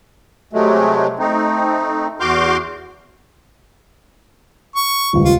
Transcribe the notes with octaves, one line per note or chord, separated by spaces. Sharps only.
C3 F#3 G#3 A3
A3 C4 D#4
E2 F#4 C6 D6 F6 G6
C#6
D#1 C#2
F4